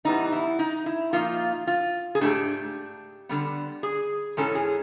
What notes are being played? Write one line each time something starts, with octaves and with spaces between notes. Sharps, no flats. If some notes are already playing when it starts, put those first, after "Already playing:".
A2 E3 G3 B3 D#4
E4
D#4
E4
A#2 F3 A#3 D#4 F4
F4
G#4
G#2 E3 A3 D4 G4
D3 G3 B3
G#4
G#2 E3 G#3 C#4 A4
G#4